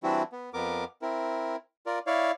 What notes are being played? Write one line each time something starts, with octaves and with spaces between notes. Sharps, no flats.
E3 G3 C4 D4 E4 F#4
B3
F2 B3 A#4 D6
C4 E4 A#4
F4 A#4 D5
E4 C#5 D5 F5